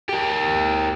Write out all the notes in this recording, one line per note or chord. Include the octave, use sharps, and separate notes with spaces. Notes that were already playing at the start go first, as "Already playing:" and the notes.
G4 A#4